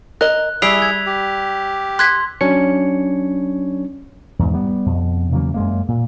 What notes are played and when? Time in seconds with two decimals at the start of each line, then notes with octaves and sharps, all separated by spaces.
0.21 A#4 D#5 F#6
0.62 G3 E4 G#4 E6 B6 C7 D7 F7
0.82 G#6
1.06 G4
1.99 C6 F#6 G#6 B6
2.41 F#3 C#4 D4 C#5 C#7
4.39 E2 G#2
4.54 G3 B3
4.86 F2 B2
5.32 E2 C#3 F#3 A#3
5.54 F#2 G#3 A#3
5.88 A#2